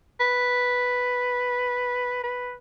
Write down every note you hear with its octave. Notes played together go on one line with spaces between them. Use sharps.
B4
B4